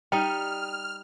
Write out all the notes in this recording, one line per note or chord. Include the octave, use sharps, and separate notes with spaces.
G3 D#4 G5 F6